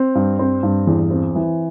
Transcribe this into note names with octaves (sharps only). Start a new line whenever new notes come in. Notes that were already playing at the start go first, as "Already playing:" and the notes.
Already playing: C4
G2
C4
G2
E2
C4
E3